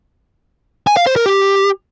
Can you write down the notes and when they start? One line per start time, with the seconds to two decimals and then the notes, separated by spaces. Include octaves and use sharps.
0.87 G#5
0.97 F5
1.06 C5
1.16 A#4
1.26 G4